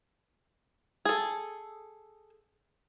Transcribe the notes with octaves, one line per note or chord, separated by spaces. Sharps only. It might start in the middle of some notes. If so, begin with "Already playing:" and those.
G#4 A4